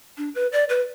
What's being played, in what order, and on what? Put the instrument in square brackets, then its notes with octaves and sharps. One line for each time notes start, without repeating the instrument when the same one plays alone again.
[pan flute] D4
B4
D5
B4